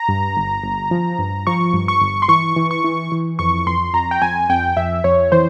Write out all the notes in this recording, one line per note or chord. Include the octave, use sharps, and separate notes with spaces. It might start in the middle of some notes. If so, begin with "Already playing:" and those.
Already playing: A#5
G2
G1
G1
F3
G2
F3 C#6
G2
C#6
G1
C6
E3 C#6
E3
C#6
E3
E3
F2 C#6
F2 C6
F2 A#5
G5
F2 G#5
F2 G5
F2 E5
F2 C#5
E3 C5